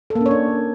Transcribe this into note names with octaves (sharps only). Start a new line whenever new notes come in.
A4
A#3
C#4
C#5
D4